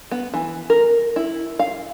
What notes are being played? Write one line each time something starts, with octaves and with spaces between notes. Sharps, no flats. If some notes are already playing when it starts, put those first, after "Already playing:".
B3
E3
A#4
E4
F5